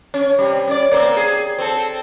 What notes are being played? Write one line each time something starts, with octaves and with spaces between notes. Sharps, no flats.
C#4
C3 G3
C#4 D5
A#3 C4
G#4
C4 A4